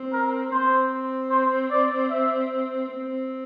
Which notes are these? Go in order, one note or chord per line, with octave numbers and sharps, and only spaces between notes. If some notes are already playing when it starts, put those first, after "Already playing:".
Already playing: C4
A#4
C4 C5
C5
D5
E5
C4